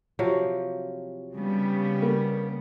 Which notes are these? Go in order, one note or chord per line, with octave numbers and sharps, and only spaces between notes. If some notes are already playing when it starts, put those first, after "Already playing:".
C3 F3 F#3
C#3 G3 B3
A#3